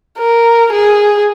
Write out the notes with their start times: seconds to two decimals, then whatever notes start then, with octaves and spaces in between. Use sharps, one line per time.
0.19 A#4
0.72 G#4